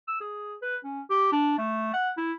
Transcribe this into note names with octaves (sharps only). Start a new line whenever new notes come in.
E6
G#4
B4
C#4
G4
D4
A3
F#5
E4